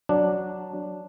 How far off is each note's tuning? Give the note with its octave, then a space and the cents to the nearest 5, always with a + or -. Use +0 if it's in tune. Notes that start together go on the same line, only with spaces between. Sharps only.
F#3 +0 D4 +0